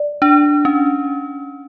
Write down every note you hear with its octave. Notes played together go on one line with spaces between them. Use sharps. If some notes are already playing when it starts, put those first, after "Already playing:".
Already playing: D5
D4
C#4